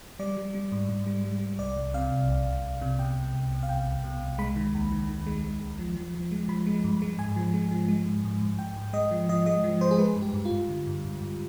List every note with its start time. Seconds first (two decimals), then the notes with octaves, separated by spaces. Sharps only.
0.19 G3 D5
0.37 G3
0.54 G3
0.72 G#2
0.89 G#2
1.06 G3
1.24 G3
1.41 G3
1.59 C2 D5
1.77 C2
1.94 C3 F5
2.12 C2
2.29 C2
2.46 C2
2.64 C2
2.82 C3
2.99 B2 G5
3.16 C2
3.34 C2
3.52 B2
3.63 F5
3.69 C2 G5
3.86 C2
4.04 B2
4.21 C2
4.38 G#3 B5
4.56 D#3
4.75 D#2
4.92 D#3
5.09 D#3
5.27 G#3
5.44 G#3
5.62 D#2
5.79 F3
5.97 F3
6.15 F3
6.31 G#3
6.49 F3 B5
6.67 G#3
6.84 G2
7.02 G#3
7.18 G#2 G#5
7.36 F3
7.54 G#3
7.71 F3
7.88 G#3
8.06 G#2
8.24 G#2
8.42 G#2
8.59 G#2 G5
8.76 G#2
8.93 G#3 D#5
9.11 F3
9.29 F3 D#5
9.46 G#3 D#5
9.64 F3
9.81 G#3 C5
9.91 G#4
9.98 G#3 B4
10.16 G2
10.22 G4
10.33 G2
10.45 F4
10.51 G2
10.69 D3
10.87 G2
11.04 G2
11.21 G2